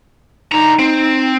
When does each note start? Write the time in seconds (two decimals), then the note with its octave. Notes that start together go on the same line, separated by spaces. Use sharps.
0.52 D3 D#4 A#5
0.79 C4